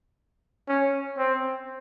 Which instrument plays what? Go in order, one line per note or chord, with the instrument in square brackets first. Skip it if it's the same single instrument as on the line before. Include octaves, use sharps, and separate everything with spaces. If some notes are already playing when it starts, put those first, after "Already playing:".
[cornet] C#4
C4